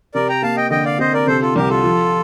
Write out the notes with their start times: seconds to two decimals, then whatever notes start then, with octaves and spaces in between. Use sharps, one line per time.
0.14 C3 A#4 D5
0.29 G5 A#5
0.42 A#3 F5 A5
0.57 D#5 G5
0.71 D3 D#5 G5
0.85 D5 F5
0.99 C4 C5 D#5
1.13 A#4 D5
1.27 C3 A4 C5
1.41 F4 A4
1.56 C2 G4 A#4
1.70 F4 A4
1.84 F3